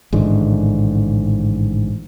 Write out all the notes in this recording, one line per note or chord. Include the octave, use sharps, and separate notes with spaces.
A1 G#2 D3 D#3